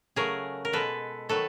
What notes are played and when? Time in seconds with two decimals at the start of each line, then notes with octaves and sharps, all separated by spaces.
0.16 C#3 F#3 A3 G#4 A#4
0.65 A#4
0.73 B2 G#3 A4 B4
1.29 D#3 F#3 A3 A4 B4